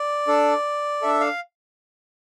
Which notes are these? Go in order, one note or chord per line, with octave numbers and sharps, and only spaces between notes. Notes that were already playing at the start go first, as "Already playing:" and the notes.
Already playing: D5
D4 A4
D4 A4 E5
F5